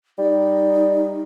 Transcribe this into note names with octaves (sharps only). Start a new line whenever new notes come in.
G3 D#4